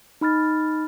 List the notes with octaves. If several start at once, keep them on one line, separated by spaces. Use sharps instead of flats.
D#4 B5 F6 A6